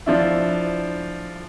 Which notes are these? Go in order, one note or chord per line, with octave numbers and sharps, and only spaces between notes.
F3 D4 E4